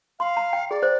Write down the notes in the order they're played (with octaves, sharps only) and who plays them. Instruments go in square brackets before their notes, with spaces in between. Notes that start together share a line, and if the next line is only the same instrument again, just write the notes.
[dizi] F5 [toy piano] C6
[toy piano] A#5
G5
[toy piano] G#4 [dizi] D5
[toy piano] C5